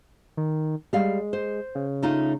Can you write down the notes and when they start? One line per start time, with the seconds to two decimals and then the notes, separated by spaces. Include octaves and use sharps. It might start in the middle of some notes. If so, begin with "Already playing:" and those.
0.37 D#3
0.93 G3 G#3 F5
1.33 C5
1.75 C#3
2.02 A3 D#4 F4